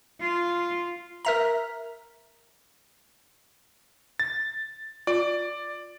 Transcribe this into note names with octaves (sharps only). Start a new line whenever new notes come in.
F4
A#4 E5 A#5
A6
F4 D5